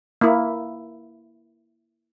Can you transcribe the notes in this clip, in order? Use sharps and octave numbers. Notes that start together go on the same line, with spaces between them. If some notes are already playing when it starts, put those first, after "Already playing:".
A#3 E4